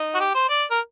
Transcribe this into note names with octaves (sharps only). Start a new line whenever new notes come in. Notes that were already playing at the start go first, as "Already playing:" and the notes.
Already playing: D#4
F#4
G4
C5
D5
A#4